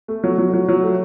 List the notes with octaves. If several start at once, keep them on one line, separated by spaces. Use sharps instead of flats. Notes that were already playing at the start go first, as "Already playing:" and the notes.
A3
F#3
F#3
F#3
F#3
A3